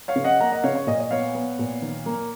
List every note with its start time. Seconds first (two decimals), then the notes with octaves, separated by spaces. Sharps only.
0.08 C#5 F5
0.16 C#3
0.24 D#5 F#5
0.40 A#3 F#5 A#5
0.52 D#5 F#5
0.63 C#3 C#5 F5
0.75 C#5
0.87 A#2 D#5
1.00 D#5
1.11 B3 C#5 F5
1.35 B3
1.59 A#2
1.82 D#3
2.06 A#3